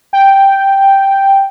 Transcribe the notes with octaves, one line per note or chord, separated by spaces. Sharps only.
G5